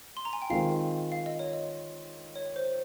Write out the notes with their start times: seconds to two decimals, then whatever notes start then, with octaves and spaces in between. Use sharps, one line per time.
0.17 C6
0.25 A#5
0.33 G#5
0.42 G5
0.50 D#3 G#3 C4 F4 F5
1.12 F5
1.26 D#5
1.39 C#5
1.53 D#5
2.36 C#5
2.56 C5